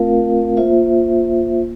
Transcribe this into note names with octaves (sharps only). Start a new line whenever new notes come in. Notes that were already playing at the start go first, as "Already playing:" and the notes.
Already playing: A3 C4 F4 A#4 F5
A#3 F4 C5 E5